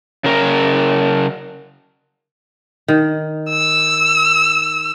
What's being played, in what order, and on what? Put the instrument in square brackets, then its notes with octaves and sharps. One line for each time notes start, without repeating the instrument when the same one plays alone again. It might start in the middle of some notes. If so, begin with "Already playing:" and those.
[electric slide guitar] C#3 A#4
[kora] D#3
[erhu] E6